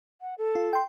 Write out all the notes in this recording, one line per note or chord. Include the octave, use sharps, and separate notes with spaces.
F#5
A4
F4
G5 C6